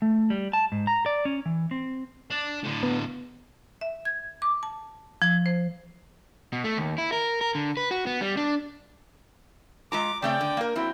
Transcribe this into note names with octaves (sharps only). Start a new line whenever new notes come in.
A3
G3
A5
G#2
A#5
D5
C#4
E3
C4
D4
A2 D3
B3
E5
G#6
D6
A5
F3
C5
B2
A3
D#2
E4
A#4
A#4
D3
B4
F#4
B3
G3
D4
G#3 F4 A#5 D6
C#3 A3 C4 D5 G5
D3
A#3 A#4
F#3 C4 E4